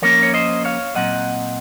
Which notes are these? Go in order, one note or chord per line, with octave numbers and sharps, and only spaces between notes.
F3 A#3 C#4 A#4 C#5
C#5
C5 D#5
C#5 F5
A#2 F#3 C4 D#5 F#5